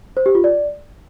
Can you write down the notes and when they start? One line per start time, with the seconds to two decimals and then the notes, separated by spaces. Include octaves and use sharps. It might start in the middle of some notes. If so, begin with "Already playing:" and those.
0.17 C5
0.26 G4
0.35 F4
0.44 D5